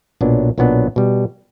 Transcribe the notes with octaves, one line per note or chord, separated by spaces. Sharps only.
B1 A#2 F#3 B3 D4
B1 A#2 F#3 B3 D4
B2 G3